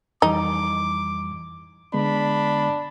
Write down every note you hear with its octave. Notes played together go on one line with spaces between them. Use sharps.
F2 E3 G3 D#4 D6
D3 G#3 B3 D4 B5